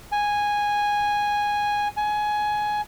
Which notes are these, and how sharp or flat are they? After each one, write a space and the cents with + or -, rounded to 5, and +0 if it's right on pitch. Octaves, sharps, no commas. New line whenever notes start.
G#5 -10
G#5 +15